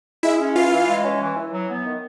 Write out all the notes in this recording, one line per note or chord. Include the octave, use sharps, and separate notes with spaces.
G#3 E4 E5
C#4
E3 F4 F5
E3
G#3
C#4
E3
E3
F#3
B3
D#3